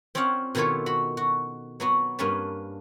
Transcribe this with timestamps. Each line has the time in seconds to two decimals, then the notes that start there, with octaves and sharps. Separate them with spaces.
0.15 C4 C#4 F4 D5 F5 F#5
0.55 B2 D#3 E4 F4 A4 C#5
0.86 F#4 B5
1.17 F#4
1.80 F#3 B3 F#4
2.19 G2 A#3 C#4 D4 B4 A5